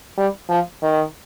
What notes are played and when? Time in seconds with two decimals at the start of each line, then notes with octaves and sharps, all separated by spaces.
0.18 G3
0.49 F3
0.83 D#3